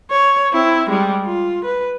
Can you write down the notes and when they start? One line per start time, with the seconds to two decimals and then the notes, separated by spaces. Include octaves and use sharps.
0.11 C#5
0.51 C4 E4
0.89 G3 G#3
1.25 F4
1.65 B4